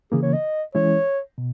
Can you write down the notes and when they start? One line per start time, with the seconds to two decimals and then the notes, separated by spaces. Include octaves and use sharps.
0.12 C#3 E3 A#3 G#4
0.23 C#5
0.33 D#5
0.75 E3 G#3 C#4 E4 C#5
1.38 B2